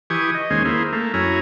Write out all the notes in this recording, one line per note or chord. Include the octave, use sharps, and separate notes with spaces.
E3 G4 G#5 C#6 D#6
D#5
D#2 G#3 C#4 C5 G#5
A#3 E4 G#4 C5
A3 A#3
F#2 E4 C#5 G#5 A#5